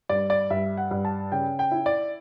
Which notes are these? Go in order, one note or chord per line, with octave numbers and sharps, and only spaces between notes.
G2 D5
D5
G2 E5
F#5
G2
A5
C#3 G5
G5
E4
D5